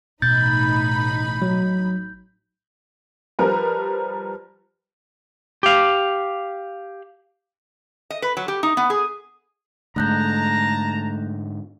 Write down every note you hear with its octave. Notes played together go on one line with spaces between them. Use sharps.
A1 B2 D#4 B5 G6 A6
F#3
F3 G3 A#4 B4
G4 F5
D#5
B4
F#3
G4
D#4
B3
G#4
G#2 D3 A3 A5 A#5 F#6 G6